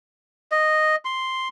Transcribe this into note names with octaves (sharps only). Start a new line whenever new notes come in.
D#5
C6